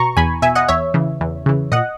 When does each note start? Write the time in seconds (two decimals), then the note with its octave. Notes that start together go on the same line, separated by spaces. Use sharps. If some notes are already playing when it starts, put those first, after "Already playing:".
Already playing: B2 A#5 C#6
0.17 E2 G#5 B5
0.42 B2 E5 G#5
0.55 D#5 F#5
0.68 E2 C#5 E5
0.94 C#3 E3
1.21 E2
1.46 C#3 E3
1.72 A#2 D#5 F#5